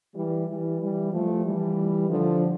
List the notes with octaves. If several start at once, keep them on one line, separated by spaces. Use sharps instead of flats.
E3 G3
E3 G3
E3 G3
F3 A3
E3 G3
D3 F3